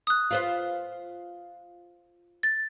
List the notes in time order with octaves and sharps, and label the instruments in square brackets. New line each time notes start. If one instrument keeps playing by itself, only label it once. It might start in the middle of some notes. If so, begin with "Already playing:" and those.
[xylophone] D#6 F#6
[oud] F4 B4 C5
[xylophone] A6